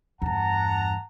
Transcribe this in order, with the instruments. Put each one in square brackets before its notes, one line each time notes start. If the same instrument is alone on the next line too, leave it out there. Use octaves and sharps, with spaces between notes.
[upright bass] E2 G2 [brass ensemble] F#5 A5 A#5